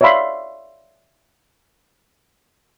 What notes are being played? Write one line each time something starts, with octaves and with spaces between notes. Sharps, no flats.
C#5 D5 E5 F5 B5 C6